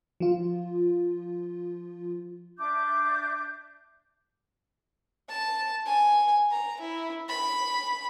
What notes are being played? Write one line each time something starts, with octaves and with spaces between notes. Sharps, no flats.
F3 F4
D4 E5 D6 G6
A5
G#5
A#5
E4
B5